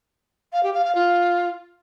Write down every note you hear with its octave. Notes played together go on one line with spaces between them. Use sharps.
F5
G4
F5
F5
F4